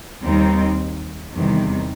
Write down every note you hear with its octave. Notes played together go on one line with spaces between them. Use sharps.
D#2 D#3 G3 C4 D#4
E2 C3 D#3 G3